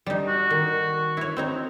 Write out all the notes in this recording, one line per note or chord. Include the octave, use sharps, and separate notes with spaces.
G3 D#4
F#4
D#3
E4 C#5
C4 D#4 A#5